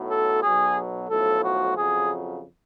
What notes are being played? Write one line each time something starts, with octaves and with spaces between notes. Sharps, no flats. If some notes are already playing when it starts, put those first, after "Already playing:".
Already playing: B1 A2 F#3
A4
B1 B2 F#3 G#4
B1 A2 F3 A4
F#4
F2 C#3 F#3 G#4